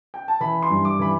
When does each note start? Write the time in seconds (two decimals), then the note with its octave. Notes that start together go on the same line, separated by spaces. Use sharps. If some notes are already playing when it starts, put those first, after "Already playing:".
0.14 G5
0.28 A5
0.40 E3 B5
0.63 C6
0.70 G2
0.85 D6
0.99 E3 B5